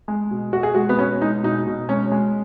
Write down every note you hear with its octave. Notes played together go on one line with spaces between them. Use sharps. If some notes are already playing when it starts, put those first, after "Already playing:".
G#3
B2
B2 F#4
G#4
G#3 F#4
B3
B2 C#4
G#3 D#4
B2 D#4
B2
G#3 C#4
G#3